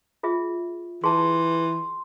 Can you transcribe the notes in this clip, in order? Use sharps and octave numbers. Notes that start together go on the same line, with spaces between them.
F4 G#4 E5
E3 G#4 A5 C6